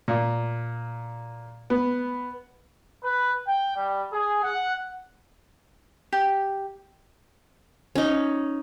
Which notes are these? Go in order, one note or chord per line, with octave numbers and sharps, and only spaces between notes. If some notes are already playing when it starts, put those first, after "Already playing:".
A#2
B3
B4
G5
G3
G#4
F#5
G4
C#4 D#4